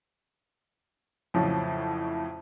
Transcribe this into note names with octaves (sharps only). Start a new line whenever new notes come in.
F2 A2 C#3 F3 F#3